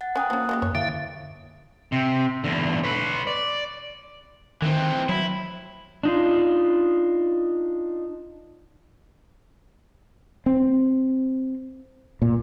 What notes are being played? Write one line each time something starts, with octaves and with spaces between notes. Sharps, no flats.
F#5 A6
C#4 G5 G#5 A#5 D#6 F#6
F3 A#3 C#4
F#3 G#3 G4
F#2 C#5
D3 E4 G4 E5 F5
C3
E2 D3
B4 C#5
D5
D#3 E3 C4
F#3 E4
D4 D#4 F4
C4
A#2